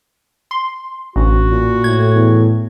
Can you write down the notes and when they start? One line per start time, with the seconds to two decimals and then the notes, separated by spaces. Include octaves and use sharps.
0.51 C6
1.16 A1 D2 F#4
1.51 A#2
1.84 A2 G#6
2.15 E2